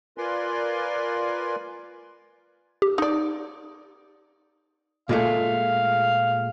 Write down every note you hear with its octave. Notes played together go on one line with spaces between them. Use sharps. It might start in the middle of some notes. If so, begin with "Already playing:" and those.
F4 A#4 B4 D5 G#5 C6
G4
D#4 D5
A#2 G#3 A3 F5